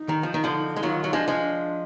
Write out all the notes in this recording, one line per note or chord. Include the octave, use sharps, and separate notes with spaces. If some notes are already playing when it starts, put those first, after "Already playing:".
Already playing: D#4
D#3
F3
D#3
D3 F3
G#3
D#3 F#3 F4
F#3
F3 G#3 D4
F3 G#3
D4